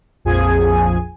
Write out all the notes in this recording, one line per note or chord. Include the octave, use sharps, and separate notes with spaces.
A#1 F2 F3 G#4 G#5